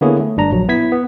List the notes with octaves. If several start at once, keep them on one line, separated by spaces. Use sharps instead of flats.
D3 A#3 B3 E4 G#4 C#5
A3
G1 G2 D4 A#5
A#1 F#3
B3 E4 G#6 B6
B3